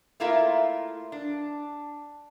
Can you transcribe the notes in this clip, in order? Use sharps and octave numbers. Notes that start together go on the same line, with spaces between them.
A3 A#3 E4 F4 A#4 E5
D4